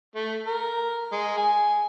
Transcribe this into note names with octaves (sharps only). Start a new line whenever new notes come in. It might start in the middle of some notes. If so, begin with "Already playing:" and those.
A3
A#4
G#3
G#5